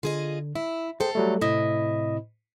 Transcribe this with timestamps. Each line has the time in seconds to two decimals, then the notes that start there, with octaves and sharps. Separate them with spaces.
0.03 D3 F4 G#4 D#5
0.55 E4 E5
1.00 G#4 A4 C5 F5 G5
1.15 F#3 G3 A3
1.41 A2 C3 E4 D#5